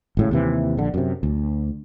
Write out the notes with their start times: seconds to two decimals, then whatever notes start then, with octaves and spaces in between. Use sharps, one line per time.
0.17 G#1 A2 C#3
0.31 D#2 C3 E3
0.77 A#1 D3
0.94 F#2 C3
1.23 D2